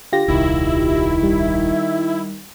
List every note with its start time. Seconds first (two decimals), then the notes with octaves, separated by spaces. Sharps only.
0.13 D3 F4 G4 A#6
0.28 D#1 C2 D#3 E4
1.23 G3